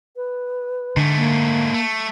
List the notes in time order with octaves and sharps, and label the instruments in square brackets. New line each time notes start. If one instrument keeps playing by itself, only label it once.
[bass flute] B4
[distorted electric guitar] G#2 A3 [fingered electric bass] D3
[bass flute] A#3
[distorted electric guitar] A3